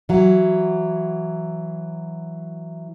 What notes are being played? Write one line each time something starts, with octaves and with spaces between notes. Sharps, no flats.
E3 F#3